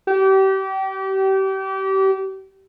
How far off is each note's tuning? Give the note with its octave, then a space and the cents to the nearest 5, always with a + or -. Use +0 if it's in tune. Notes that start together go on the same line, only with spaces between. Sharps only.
G4 -30